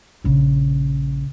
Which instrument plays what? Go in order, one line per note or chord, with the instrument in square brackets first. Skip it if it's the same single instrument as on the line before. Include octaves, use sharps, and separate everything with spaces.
[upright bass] A#1 C#3